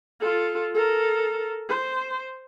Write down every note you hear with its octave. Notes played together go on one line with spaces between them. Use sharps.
F4 A4
A4 A#4
C5